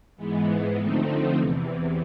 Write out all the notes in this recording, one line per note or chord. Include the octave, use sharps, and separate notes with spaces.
G#2 E3 G#3 B3
D3 F3 A3 C4 D#4
E2 C3 E3